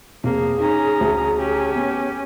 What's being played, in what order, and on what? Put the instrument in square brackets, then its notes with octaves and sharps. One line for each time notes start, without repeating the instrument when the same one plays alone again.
[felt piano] F1 [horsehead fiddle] A#3 [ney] G#4
[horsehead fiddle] C#4 A#5 [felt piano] D#4
[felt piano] D2
[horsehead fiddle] C#4 G4
[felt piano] B3